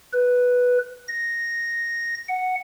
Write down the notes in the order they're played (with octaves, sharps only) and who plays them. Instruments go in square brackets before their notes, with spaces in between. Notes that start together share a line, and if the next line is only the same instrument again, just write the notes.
[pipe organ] B4
A#6
F#5